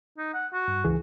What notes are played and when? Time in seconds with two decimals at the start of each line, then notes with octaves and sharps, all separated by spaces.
0.18 D#4
0.34 F#5
0.53 F#4
0.68 G2
0.85 C#2 E3 G#4